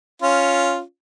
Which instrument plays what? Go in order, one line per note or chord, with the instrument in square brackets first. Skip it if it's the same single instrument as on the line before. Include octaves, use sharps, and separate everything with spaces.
[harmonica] C#4 F4